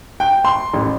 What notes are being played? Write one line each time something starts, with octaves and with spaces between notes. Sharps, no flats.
G5
C6
A1